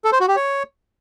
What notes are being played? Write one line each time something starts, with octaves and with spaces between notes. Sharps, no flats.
A4
C5
F#4
G4
C#5